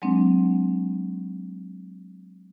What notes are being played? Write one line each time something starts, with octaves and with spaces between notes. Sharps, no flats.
F#3 G#3 A#3 C4 D4